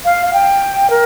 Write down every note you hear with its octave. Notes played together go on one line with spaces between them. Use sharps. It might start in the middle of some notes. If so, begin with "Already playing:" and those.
F5
F5
G5
A#4